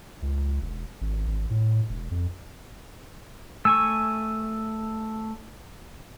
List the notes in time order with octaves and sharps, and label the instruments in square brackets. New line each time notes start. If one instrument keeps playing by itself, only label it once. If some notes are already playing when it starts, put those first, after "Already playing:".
[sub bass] C#2
E1
G#1
G#1
A2
E1
F2
[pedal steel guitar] A3 G#5 C#6 [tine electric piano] E6